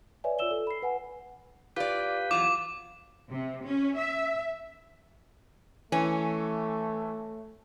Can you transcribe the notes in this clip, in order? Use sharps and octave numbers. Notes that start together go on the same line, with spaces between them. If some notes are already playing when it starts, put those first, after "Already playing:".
B4 C#5 D5 E5 G#5
F4 C#5 D5 E6 E7 G7
A4
B5 C7
B4 F#5 G#5
F4 G4 B4 D5 F5
E2 F#3 F4 D6
C3
C#4
E5
E3 A3 C#4